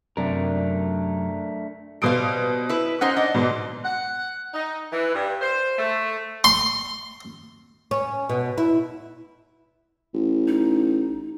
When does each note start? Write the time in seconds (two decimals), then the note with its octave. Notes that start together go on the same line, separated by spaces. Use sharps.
0.17 F#2 C3 A3 D4 A#4
2.02 B2 G3 C5 F5 D#6 D7
2.69 E4 B4
3.01 C#4 D#4 C5 F#5
3.16 D4 D#5
3.34 G#2 B2
3.84 F#5
4.54 D#4
4.92 E3
5.14 G2
5.41 C5
5.78 A3
6.44 C6
7.91 C#4
8.29 B2
8.58 E4
10.14 A1
10.48 D#4